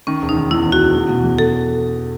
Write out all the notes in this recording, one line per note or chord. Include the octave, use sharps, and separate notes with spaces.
D#3 C#4
E1
D#4
D#3
E2 E4
E1
F#4
E1
E2
B2
E2
A4